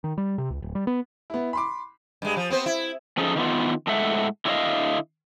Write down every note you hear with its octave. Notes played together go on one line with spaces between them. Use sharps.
D#3
G3
C3
C#2
D1
G3
B3
B3 E4
B5 C6 D6
G2 G#3
F3
B3 C4 C5
E4
F3 C#4 D#4 G#4 A4
D#3 E3 B3 F4
A2 G#3 A4 E5 F#5
D3 E4 F#4 C#5 D#5 F5